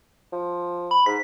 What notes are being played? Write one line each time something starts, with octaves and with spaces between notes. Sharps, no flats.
F3
B5
G#2 B6